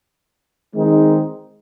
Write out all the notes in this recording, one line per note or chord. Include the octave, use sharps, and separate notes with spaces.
D#3 G#3 C4 D#4